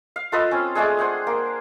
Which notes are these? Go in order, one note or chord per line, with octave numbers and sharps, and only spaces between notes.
F5
F4 A4 B4 D#5
C4 C#4
G#3 A3 D4 G#4
C5 F#5 G#5
A#3